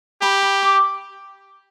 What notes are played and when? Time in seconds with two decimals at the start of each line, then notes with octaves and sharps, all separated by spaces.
0.22 G4 B5
0.42 B5
0.63 D6